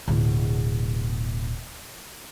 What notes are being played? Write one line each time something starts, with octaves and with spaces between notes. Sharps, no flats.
D1 B2